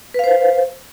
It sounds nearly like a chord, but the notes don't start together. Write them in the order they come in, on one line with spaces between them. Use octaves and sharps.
B4 F5 C5